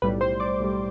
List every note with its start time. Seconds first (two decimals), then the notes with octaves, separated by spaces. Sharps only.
0.02 B1 A2 G3 B4 B5
0.21 C5 C6
0.40 D5 D6
0.59 B1 A2 G3